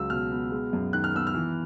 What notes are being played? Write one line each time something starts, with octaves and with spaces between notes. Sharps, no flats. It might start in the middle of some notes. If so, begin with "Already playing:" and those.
Already playing: C#2 F#3 E6
B2 F6
B3
G#3
F#2
D#3 F#6
F6
B3 E6
F6
E3